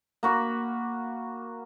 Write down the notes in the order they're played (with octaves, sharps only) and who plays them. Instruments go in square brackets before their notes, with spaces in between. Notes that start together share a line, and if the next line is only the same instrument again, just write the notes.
[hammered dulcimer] A#3 F#4 B5